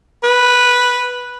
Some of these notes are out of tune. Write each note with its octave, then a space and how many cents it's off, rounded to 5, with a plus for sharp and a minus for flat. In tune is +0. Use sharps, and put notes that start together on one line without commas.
B4 -5